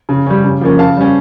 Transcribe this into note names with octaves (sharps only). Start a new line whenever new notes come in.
C#3
G3 C#4
C#3
F3 A#3 C#4
C#3 F5 A5
G3 C#4